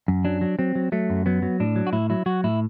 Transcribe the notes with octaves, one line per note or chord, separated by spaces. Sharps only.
F#2
F#3 D4
F#3
F#3 C4
F#3
F#3 A3
F#2
F#3 B3
F#3
A2 D4
F#3
F#4
A2 E4
F#3 E4
F#3 F#4
A2 E4